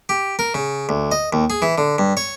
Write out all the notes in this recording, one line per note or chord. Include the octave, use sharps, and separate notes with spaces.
G4
A#4
C#3
D2
D#5
D#2
G#4
E3
D3
G2
C#5